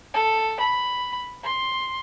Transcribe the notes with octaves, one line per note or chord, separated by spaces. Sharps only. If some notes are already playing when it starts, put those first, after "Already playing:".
A4
B5
C6